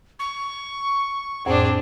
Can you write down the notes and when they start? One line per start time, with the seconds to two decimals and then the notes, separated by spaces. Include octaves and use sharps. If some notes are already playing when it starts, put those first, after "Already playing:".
0.19 C#6
1.46 F2 A2 C4 D4 G#4